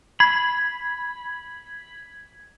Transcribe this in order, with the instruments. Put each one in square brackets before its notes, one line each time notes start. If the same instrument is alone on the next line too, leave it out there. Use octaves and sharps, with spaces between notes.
[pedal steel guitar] B5 [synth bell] G#6